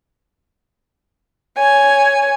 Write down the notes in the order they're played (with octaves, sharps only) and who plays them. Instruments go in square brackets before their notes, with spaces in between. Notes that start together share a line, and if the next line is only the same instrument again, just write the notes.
[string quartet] C#5 G#5